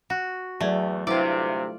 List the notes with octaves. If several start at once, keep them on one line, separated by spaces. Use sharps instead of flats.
F#4
E2 F#3 A3 D5 G#6
D2 G2 C3 E4 F4 B4 C5 D5